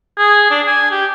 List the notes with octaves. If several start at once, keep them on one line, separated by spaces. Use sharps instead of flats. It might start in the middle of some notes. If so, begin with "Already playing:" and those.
G#4
D4
G#5
G4